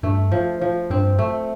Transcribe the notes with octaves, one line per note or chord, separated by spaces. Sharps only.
G2 A3
F3
F3
G2 C4
A3